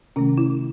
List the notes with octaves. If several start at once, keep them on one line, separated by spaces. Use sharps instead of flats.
C3 D#3 A3 C#4
E4